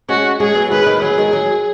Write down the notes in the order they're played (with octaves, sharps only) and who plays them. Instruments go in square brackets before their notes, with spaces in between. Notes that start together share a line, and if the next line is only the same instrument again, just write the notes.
[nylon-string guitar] G#3 C#4 [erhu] F#4
[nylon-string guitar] G#3 C#4 [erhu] G#4
[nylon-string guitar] F#3 B3
[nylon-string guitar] D#3 G#3 [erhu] B4
[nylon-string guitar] D#3
[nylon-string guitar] F#3 [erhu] G#4
[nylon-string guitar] B3
D#3 G#3
F#3